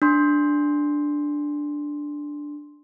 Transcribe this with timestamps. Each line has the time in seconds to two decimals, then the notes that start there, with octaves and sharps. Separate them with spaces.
0.02 D4 C6